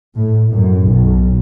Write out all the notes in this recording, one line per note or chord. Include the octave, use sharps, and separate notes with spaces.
A2
F#2
B1